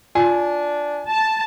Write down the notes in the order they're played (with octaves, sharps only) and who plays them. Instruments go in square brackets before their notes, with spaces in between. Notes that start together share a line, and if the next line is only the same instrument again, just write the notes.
[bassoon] D4 [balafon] F4 [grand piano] G#5
[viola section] A5